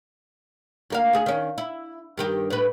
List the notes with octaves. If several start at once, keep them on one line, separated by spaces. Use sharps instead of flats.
D2 A#3 F5
D2 G#4
D#3 C#4
E4
G2 D#3 G4
A2 B4